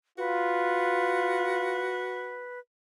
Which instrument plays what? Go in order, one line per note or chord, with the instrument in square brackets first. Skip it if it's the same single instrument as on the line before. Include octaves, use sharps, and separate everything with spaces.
[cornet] F4 [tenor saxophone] F#4 [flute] B4